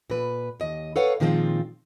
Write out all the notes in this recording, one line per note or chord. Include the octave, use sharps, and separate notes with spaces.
A#2 B4
D#2 D#5
A4 B4 C#5 F5 F#5
A#2 D#3 F3 G#3 C4 F4